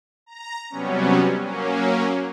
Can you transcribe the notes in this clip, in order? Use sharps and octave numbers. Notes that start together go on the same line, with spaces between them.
A#5
C3 F#3 G3 B3 C#4
F#3 A#3 C#4